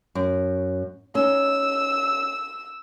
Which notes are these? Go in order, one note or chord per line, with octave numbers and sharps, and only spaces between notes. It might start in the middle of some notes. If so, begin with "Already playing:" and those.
F#2
C#4 D#4 E6